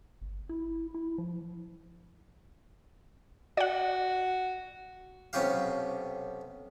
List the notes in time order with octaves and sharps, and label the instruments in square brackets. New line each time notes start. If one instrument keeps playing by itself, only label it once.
[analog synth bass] G1
E4
E4
F3
[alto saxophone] F#4 [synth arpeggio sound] D5 F#5
[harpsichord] B1 C3 C#4 F4 G4 F5